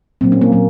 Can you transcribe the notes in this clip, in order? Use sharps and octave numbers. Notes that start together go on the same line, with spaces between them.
A#2 F#3 A#3 C4
C#4
A#3
A#2 F#3 A#3